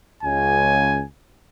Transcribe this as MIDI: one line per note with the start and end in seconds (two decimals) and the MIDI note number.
0.23 1.02 37
0.23 1.05 80